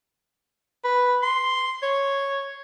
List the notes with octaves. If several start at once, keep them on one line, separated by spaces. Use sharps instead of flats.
B4
C6
C#5